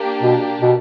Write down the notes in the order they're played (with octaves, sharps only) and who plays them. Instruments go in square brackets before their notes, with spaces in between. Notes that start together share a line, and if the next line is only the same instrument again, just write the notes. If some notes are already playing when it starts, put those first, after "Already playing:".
Already playing: [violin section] A#3 D4 G4
[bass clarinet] B2
B2